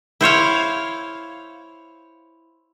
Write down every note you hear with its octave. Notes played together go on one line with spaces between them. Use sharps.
E4 C5 C#5 F5